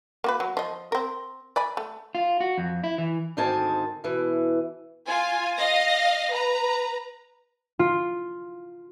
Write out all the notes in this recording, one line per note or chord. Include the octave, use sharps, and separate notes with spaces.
A#3 F#4 B4
F#3
F3 D#5
C4 A#4
D5 G#5 B5
A3
F4
F#4
F2
E4
E3
D2 G#2 D#3 C4 G#5 A5
B2 E3
F4 G#5
D#5 F5 A#6
B4 A#5
F4